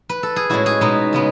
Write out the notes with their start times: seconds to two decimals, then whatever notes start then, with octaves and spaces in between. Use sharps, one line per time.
0.09 B4
0.23 A4
0.36 G#4
0.50 A2 G#3 C#4 E4 F#4
0.66 G#4
0.81 B2 G#3 B3 D#4
1.13 C#3 G#3 B3